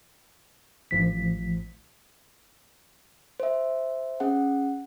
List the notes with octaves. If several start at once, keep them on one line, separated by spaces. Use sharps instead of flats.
A1 F3 B6
C5 E5
C#4 G#4 F#5